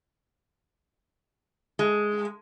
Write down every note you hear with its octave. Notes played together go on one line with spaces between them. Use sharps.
G#3